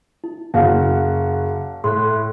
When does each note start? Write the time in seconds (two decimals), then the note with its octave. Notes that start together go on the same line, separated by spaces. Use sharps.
0.24 E4
0.54 F#1 F#4 F5 F6
1.84 A2 C6 F#6